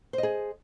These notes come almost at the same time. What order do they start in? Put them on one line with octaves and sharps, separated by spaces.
C5 D#5 G#4